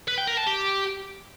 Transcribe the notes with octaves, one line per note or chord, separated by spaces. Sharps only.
B4
G5
A#4
A5
G4